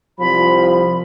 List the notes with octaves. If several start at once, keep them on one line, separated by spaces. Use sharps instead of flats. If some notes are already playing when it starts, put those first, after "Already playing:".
C2 F3 B5